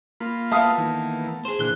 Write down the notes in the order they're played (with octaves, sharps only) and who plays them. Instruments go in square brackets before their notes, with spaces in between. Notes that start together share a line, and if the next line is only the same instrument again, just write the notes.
[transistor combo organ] A#3 F4 B5
[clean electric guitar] A3 B3 [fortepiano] E5 F5 D#6 [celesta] A5
[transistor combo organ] D#3 E3 A#3
[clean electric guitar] G#4 C5
[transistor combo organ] A#2 D3 E3 [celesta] F#6 G7